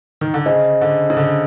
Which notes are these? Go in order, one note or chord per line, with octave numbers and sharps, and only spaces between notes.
D#3
D3
C#3 G#4 C5 D#5 G#5
D3
C#3
D3